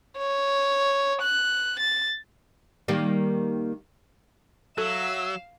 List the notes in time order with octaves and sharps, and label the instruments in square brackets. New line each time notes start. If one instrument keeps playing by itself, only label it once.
[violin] C#5
F#6
A6
[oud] D#3 G3 A#3
[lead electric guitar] F#3 [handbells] A4 [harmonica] E5 [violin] F5 E7